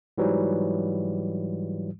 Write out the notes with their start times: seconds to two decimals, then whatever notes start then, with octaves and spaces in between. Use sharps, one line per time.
0.18 G#2 E3 F#3 G3